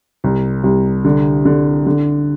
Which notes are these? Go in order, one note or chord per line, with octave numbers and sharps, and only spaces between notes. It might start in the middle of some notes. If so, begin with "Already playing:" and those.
C2
C2
D3
D3
D3